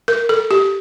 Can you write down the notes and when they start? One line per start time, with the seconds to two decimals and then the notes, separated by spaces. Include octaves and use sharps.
0.08 A#4
0.29 A4
0.51 G4